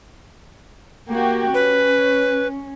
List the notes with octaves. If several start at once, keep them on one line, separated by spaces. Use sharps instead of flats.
A#3 F#4 G4
C#4 B4